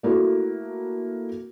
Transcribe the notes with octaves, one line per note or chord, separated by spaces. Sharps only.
A3 A#3 E4 F#4